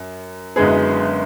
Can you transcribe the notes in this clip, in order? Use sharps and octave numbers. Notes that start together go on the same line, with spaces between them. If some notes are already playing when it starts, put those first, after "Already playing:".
Already playing: F#2
F#1 F#2 D3 G#3 B3 G#4